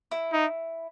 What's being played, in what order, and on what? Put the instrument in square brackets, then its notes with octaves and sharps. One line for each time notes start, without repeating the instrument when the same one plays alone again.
[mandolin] E4
[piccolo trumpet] D#4